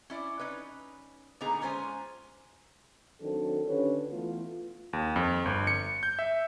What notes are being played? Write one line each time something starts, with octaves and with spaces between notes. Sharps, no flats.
C#4 E4 D5
C#4 D#4 B4
A#2 D3 B3 D#4 G#4 A#5
G#3 C#4 F4 C5 G#5
D#3 F#3 C4 D4 A4
D3 C#4 F4 G4 B4 C#5
E3 A3 B3 F4
D#2
F2
G1
C#7
G6
E5